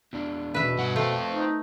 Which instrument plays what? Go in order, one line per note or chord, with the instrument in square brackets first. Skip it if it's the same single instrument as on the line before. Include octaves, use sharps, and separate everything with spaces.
[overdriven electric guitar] E2 D4
[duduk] B2 [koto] B4 E5
[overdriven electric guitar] G2 F#5
[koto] A3 [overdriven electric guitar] C4 F4
[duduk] D#4